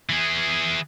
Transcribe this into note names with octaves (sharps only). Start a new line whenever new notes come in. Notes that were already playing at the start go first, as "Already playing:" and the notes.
E3 G#4